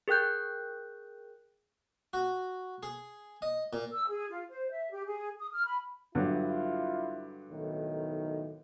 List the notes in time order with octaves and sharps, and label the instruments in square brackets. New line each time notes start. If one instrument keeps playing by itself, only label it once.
[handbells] G#4 A#4 G5 F#6 G6
[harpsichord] F#4
G#4
D#5
A#2
[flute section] E6
G#4
F4
C5
E5
G4
G#4
D#6
F6
B5
[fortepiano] G2 D3 F#3 [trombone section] E4 F4
[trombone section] B1 A2 D#3